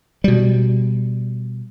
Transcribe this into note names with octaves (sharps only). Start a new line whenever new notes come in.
B2 G3